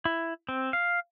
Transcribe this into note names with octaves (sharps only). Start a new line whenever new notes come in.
E4
C4
F5